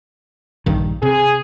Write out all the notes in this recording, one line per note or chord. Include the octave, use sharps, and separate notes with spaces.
A#1 G2 D#3
C3 G#4